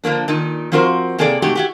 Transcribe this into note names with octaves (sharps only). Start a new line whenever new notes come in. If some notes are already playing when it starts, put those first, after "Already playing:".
D3 F3 A#3 D4
A#2 D#3 D#4
F3 C4 F4 F#4 A#4 C5
C3 A#3 G#4 A4 C5 D5
G#2 C3 A3 F#4 G4
E4 F#4 G4